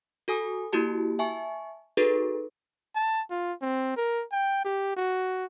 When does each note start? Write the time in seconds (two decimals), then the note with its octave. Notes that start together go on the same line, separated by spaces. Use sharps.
0.28 F#4 A4 G#5 D#6
0.73 A#3 E4 F#4 G4 A5
1.19 E5 G#5 A5 C#6
1.97 D#4 F#4 G#4 A4 B4
2.95 A5
3.30 F4
3.61 C4
3.97 A#4
4.32 G5
4.65 G4
4.96 F#4